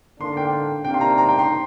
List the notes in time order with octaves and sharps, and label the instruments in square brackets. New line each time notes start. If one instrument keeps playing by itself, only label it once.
[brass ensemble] D3 A#3 D4 [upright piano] C6
[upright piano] G5
[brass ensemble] C3 A#3 D4 [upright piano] G5
[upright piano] C6
A#5
A#5
G5
C6